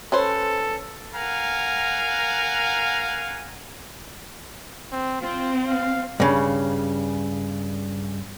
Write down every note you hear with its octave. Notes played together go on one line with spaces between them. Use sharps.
C#4 A4 B4 C5
A#4 F5 F#5 G#5 A#5
C4
C4 F4
F5
G2 C#3